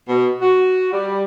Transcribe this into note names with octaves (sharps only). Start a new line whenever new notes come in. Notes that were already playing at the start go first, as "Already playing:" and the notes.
B2
F#4
G3